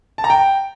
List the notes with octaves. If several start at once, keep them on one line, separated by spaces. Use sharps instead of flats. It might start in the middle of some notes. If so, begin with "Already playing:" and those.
A5
A#5
G5